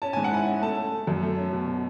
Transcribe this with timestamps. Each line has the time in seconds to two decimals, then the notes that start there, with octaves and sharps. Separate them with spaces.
0.02 C#4 A5
0.13 G#2 G#5
0.24 F#5
0.32 E4 G#5
0.47 C#4
0.62 A3 A5
0.77 A3
0.92 A3
1.07 F#2
1.23 A3
1.37 C#4
1.53 B2
1.68 B2